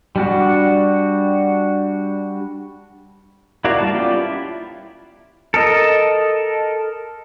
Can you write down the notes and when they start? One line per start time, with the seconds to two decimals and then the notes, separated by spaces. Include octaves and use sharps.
0.16 G3 D4 F#4
3.65 E4 F#4 A#4 D5 F5
3.78 G3 A#3 A5
3.95 B3 C#4 F4 G4 D5
4.22 E4
5.54 A4 A#4 D#5